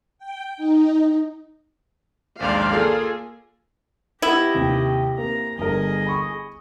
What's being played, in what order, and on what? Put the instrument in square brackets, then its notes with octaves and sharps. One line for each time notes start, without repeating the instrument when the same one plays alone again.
[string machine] G5
D#4
[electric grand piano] A#1 D#2 G#2 [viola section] C5 D5 F5
[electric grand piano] A#3 F4 A4 [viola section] G#4
[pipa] B3 E4 [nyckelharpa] G4 D#5
[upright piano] D#2 C3 D#3
[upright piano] A#3 C4 [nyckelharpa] A#5
[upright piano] G1 A#4 [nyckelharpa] G#4 D#5
[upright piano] B5 C#6 D#6